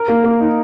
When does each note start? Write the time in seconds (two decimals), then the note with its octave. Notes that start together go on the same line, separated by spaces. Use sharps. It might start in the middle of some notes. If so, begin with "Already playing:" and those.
Already playing: A#4
0.08 A#3
0.24 A#3
0.40 D#4